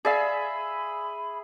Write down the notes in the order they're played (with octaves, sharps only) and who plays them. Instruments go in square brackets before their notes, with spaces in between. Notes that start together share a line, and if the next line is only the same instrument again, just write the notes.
[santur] G#4 E5 [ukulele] D5 F5 [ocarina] B5